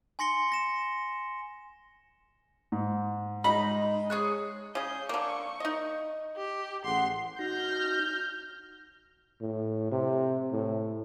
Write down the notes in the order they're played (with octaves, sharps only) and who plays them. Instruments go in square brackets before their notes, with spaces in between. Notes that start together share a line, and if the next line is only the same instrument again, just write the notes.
[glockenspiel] G#5 C6 A#6 C#7 G7
A#6 E7
[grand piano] G#2
[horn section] G#3 [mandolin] D#4 [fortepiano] B5
[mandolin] G#4 C#5 F#6
[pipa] C#3 G#4 [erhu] G6
[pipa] D3 A#3 [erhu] C#6
[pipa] D#4 D#5
[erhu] G4
[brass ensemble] A1 G#4 F#5 [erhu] C6
[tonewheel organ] D#4 F#4 A#6 [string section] F6 G6
[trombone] A2
C3
A2